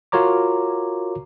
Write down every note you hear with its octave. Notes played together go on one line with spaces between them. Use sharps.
F4 F#4 A#4 C#5 A#5 D6